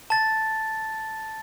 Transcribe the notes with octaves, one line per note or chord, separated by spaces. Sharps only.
A5 A6